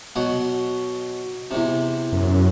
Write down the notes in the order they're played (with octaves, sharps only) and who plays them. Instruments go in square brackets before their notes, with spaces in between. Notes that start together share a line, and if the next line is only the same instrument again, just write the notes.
[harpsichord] B2 F#3 F#5
E2 C3
[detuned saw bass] F#2